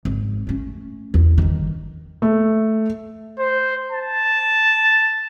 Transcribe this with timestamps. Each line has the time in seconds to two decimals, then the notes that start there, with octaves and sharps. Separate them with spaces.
0.05 G#1
0.47 A3 C#4
1.14 E2
1.38 G1 D#3
2.22 A3
3.39 C5
3.92 A5